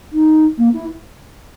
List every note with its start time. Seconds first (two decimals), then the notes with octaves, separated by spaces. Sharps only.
0.12 D#4
0.58 A#3
0.73 E4